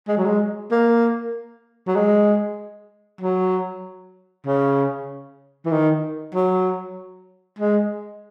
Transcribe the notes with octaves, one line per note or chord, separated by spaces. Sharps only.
G#3
F#3
G#3
A#3
F#3
G#3
F#3
C#3
E3
D#3
F#3
G#3